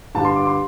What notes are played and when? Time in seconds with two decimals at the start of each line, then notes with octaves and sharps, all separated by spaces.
0.15 G1 G2 G3 A5
0.25 C6
0.36 D6
0.47 C6